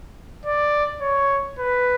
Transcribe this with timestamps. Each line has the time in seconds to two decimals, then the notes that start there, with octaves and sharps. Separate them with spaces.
0.45 D5
1.01 C#5
1.59 B4